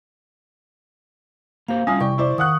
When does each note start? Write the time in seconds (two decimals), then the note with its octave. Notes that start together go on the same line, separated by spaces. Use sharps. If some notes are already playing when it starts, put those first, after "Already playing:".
1.68 A#3 G4 C5 F5
1.87 G3 C#4 E4 F4 F5 G#5 D#6
2.00 C3 E3 D5 G5 C#6
2.18 E4 C5 D5
2.38 D#3 F5 F#5 C#6 D#6 F#6